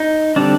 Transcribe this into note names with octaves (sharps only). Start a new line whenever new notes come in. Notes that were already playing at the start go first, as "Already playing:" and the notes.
Already playing: D#4
D3 G3 C4 D4